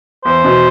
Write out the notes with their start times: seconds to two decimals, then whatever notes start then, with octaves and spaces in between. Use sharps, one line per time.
0.25 E2 C5
0.44 B2